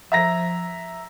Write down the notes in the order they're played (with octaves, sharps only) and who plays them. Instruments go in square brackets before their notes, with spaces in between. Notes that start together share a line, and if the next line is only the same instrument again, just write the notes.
[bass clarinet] F3 [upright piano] E5 A#5 A#6